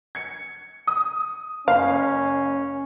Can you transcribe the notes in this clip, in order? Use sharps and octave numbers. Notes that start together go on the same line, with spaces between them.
G#6 C#7
D#6
F#1 C#4 F5 C7